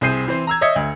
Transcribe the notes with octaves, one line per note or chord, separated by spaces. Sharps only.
C2 C4 G#4 G6 C7 D#7
E3 C4 C5
A#5 E6 G#6
C#5 D#5 E5 D#6 G#6 C#7
D2